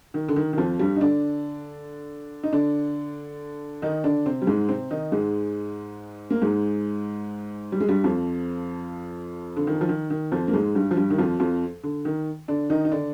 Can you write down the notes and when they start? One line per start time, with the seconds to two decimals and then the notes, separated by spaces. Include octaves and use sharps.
0.14 D#3
0.29 D3
0.36 D#3
0.53 D#3
0.58 F2 F3
0.79 G2 G3
0.96 D#4
1.01 D3 D4
2.44 D#4
2.53 D3 D4
3.82 D#3 D#4
4.04 D3 D4
4.26 C3 C4
4.42 G3
4.47 G#2 G#3
4.69 C3 C4
4.91 D#3 D#4
5.12 G#2 G#3
6.30 A#3
6.42 G#2 G#3
7.72 G3
7.80 G#3
7.88 G2 G3
8.04 F2 F3
9.57 D3
9.67 D#3
9.81 F3
9.89 D#3
10.10 D#3
10.32 F2 F3
10.48 A#3
10.53 G#2 G#3
10.75 G2 G3
10.91 F3
10.97 G2 G3
11.10 D#3
11.18 F2 F3
11.40 F2 F3
11.84 D3
12.05 D#3
12.48 D3 D4
12.70 D#3 D#4
12.85 D#4
12.92 D3 D4